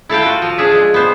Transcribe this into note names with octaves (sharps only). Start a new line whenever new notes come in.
E4 A4 F5 G5
F4 F#4
F3
D4 G#4 E5
F3 G#3
B3 C5